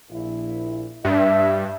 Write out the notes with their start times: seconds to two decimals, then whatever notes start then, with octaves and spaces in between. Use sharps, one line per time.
0.10 A#1 E4
1.05 G2 E5